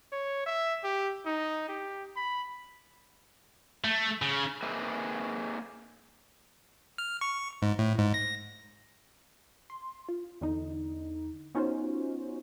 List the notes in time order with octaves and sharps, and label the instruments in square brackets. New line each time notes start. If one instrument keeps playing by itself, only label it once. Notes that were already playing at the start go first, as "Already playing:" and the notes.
[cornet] C#5
E5
G4
D#4
G4
B5
[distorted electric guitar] A3
C#3
[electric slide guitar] A#3 C4 D#4 G#4 B4 E5
[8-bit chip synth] F6
C#6
G#2
A2
G#2
A#6
[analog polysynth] C6
F4
E2 D3 D#4
B3 C#4 D#4 F4 F#4 C5